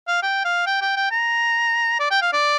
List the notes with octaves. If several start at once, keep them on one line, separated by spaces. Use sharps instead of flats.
F5
G5
F5
G5
G5
G5
A#5
D5
G5
F5
D5